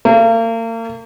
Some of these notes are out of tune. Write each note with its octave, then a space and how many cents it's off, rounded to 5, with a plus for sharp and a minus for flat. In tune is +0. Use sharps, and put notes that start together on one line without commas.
A#3 -40